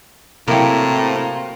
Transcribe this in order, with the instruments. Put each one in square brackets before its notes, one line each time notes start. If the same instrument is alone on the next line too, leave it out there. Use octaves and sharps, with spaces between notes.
[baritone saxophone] A2 [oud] C3 E4 [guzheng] F#3 A#3 [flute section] F5 A#5 C6